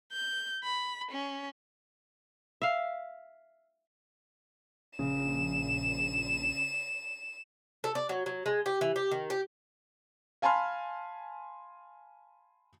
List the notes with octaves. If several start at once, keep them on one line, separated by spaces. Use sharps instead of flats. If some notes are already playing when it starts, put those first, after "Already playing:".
G6
B5
C#4
E5 F5
A#1 C#3 E7
A4
D5
F#3
F#3
G#3
G4
E3
G4
D#3
G4
F5 G#5 A5 B5 C6 F6